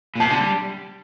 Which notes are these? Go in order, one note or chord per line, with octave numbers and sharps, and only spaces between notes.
A#2
C3 A5
D3
G3